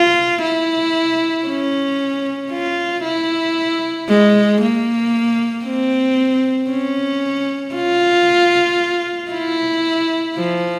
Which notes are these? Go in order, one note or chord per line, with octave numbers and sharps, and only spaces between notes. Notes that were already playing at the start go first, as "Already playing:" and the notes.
Already playing: F4
E4
C#4
F4
E4
G#3
A#3
C4
C#4
F4
E4
F3